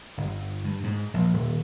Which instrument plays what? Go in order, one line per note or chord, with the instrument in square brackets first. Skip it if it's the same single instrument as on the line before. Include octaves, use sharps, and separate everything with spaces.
[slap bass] G1
G2
G#2
A#1
D#1